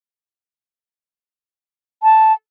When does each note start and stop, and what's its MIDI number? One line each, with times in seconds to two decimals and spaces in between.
2.03 2.33 81